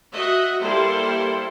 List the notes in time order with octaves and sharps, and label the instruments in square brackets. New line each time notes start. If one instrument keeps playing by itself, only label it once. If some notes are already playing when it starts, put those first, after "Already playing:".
[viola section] F#4 D#5 E5
G3 A#3 E4 A4 C5 C6